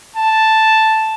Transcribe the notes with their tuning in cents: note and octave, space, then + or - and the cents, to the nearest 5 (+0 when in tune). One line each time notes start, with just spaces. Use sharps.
A5 +0